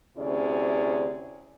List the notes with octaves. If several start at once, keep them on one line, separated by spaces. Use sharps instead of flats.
D2 C3 C#4 E4 G#4 D5